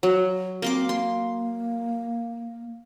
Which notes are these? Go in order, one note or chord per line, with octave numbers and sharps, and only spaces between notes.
F#3
A#3 C4 C6 D6
A#3 C6